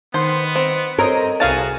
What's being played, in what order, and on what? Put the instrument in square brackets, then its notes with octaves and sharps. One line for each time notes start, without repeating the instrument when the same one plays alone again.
[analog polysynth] D#3 [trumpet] B3 [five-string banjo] C5
[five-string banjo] C4
[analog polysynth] C4 D#5 [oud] A#4 [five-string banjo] C#5
[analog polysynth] C2 G#5 [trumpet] F#4 [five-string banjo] G#4 F5 A5